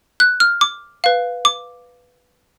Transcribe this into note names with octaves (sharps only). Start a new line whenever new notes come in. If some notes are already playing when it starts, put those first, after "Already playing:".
F#6
F6
D6
B4 F5
D6